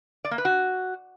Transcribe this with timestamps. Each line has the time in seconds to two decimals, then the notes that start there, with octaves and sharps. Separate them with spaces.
0.25 D5
0.31 A#3
0.38 B4
0.45 F#4